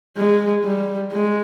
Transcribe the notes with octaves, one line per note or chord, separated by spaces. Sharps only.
G#3
G3
G#3